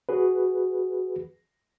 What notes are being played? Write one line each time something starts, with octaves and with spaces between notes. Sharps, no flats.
F#4 G#4 B4